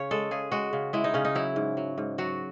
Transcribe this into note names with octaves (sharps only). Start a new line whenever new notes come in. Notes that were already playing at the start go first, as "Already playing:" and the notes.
Already playing: C#3 C#5
G#3 A4
C#3 G#4
G#3 F#4
C#3
G#3 E4
D#4
C#3 C#4
D#4
F#3 E4
G#2
F#3
G#2
F#3 F#4